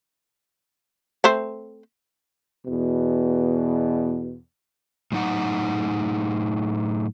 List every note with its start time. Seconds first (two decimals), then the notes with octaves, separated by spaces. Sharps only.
1.24 A3 C4 C5
2.67 E2 B2
5.12 A2 F#3 D#4 F#5